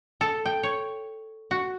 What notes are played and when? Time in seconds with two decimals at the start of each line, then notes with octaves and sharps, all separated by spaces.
0.21 A4
0.46 G5
0.63 C#5
1.51 F#4